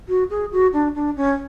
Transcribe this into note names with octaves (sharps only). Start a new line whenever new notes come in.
F#4
G#4
F#4
D4
D4
C#4